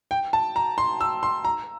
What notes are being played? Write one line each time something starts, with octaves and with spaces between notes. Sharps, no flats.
G5
A5
A#5
C6
E6
C6
A#5